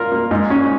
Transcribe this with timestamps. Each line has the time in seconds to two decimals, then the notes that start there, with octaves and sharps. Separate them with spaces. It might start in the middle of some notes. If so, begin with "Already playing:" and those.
Already playing: F4 A#4
0.12 A#3
0.31 G#2
0.50 C#4